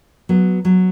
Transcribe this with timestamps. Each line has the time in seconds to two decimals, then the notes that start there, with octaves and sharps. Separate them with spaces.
0.29 F#3 B3
0.65 F#3